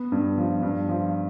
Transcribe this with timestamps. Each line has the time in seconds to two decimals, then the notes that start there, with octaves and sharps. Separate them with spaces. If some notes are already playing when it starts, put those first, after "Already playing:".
Already playing: B3
0.12 G2
0.38 F3
0.63 G2
0.89 F3